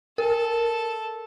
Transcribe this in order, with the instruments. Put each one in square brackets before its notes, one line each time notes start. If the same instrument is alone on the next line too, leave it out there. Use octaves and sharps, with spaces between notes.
[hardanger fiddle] A4 A5 [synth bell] A#4